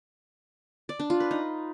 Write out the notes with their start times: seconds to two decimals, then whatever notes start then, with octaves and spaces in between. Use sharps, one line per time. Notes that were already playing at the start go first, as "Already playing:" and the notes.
0.89 D5
1.00 D4
1.10 F4
1.20 B4
1.31 D#4